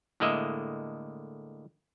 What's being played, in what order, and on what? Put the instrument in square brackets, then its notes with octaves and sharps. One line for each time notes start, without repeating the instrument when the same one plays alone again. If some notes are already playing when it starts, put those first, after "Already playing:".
[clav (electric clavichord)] A2 D3 G#3 A#3 D#5 E5